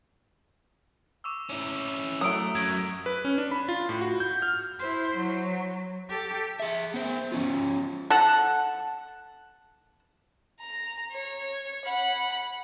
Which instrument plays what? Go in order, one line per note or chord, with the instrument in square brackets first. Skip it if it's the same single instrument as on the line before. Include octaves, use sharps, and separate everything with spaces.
[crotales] C#6 D6 E6
[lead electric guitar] C#4 E4
[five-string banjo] F#3 A3 [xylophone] D#6 D7 [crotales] E6
[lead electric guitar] F#2 [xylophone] G#6 D7
[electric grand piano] B4
C#4
D4
B5
F4
A2
F#4
G6
F6
[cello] E4 C5
F#3
G4 A4
[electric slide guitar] G#4 E5
B3 C5
F3 C#4 F4
[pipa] A4 F#5
[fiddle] A#5
C#5
F#5 B5